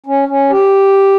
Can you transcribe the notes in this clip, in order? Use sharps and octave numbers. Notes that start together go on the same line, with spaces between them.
C#4
C#4
G4